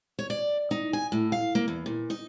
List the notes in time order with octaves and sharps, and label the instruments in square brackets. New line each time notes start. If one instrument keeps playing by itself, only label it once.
[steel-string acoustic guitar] C#5
D5
D#4
G#5
A2
F5
A#3
E2
A#2
D#4